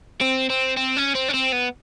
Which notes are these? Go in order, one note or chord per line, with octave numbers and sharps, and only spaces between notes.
C4
C4
C4
C#4
C4
C#4
C4
B3